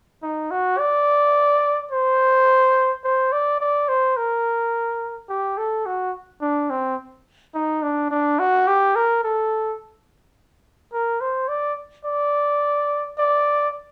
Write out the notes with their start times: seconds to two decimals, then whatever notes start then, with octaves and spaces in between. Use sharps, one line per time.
0.23 D#4
0.51 F#4
0.79 D5
1.92 C5
3.04 C5
3.32 D5
3.61 D5
3.89 C5
4.17 A#4
5.29 G4
5.57 A4
5.86 F#4
6.42 D4
6.70 C4
7.55 D#4
7.83 D4
8.11 D4
8.39 F#4
8.67 G4
8.96 A#4
9.24 A4
10.93 A#4
11.21 C5
11.48 D5
12.05 D5
13.18 D5